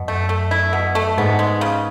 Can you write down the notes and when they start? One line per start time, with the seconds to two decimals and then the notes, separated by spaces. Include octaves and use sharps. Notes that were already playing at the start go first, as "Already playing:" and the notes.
Already playing: F#2 B2
0.08 A3
0.29 A3
0.51 E4
0.73 B2
0.95 A3
1.17 G#2 B3
1.39 G#3
1.61 C#3